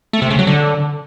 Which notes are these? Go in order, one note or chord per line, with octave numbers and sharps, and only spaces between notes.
A3
C3
C#3
F#3
D3